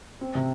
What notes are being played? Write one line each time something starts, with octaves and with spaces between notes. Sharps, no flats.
C4
C3